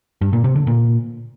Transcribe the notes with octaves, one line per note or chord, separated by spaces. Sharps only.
G2
A#2
C3
D3
A#2